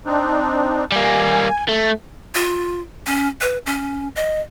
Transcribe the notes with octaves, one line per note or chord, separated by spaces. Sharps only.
C4 D4 D#4
G3 A#3 G#5
A3
F4
C#4
B4
C#4
D#5